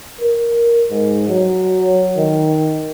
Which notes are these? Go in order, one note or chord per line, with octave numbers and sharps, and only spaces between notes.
A#4
G#2
F#3
D#3